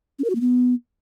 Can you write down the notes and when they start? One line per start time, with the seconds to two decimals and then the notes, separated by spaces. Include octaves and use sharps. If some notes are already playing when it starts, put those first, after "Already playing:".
0.19 C#4
0.24 A#4
0.30 F#4
0.35 A#3
0.41 B3